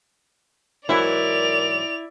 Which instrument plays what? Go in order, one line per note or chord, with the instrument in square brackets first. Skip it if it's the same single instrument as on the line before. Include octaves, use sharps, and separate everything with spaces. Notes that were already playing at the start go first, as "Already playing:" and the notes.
[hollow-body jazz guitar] G#2 E3 F#3 [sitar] E4 [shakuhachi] A#4 [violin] D5 F7